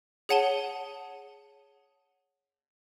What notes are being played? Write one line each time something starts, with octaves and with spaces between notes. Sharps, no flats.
G#4 C#5 F#5 A5 D#7 G7